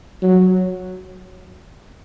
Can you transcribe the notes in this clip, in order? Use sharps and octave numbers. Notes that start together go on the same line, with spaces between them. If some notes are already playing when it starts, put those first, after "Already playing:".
F#3